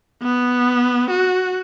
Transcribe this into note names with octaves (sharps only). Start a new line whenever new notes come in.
B3
F#4